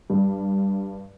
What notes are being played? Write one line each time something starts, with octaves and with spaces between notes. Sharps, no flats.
G2